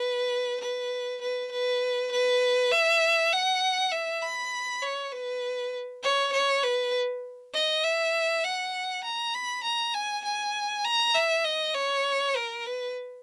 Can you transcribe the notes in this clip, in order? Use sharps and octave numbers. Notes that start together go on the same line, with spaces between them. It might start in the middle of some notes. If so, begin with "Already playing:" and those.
Already playing: B4
B4
B4
B4
B4
E5
F#5
E5
B5
C#5
B4
C#5
C#5
B4
D#5
E5
F#5
A#5
B5
A#5
G#5
G#5
A#5
E5
D#5
C#5
A#4
B4